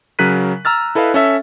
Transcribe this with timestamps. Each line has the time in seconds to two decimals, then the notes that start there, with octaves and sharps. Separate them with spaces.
0.19 C#3 F#3 A#4 F#6 B6 D#7
0.65 A#5 E6 F6 A6
0.95 E4 A4 B4 D#5 F5
1.14 C#4 A4 E5